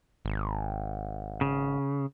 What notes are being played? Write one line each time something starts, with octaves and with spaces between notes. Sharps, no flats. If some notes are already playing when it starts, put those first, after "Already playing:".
G#1
C#3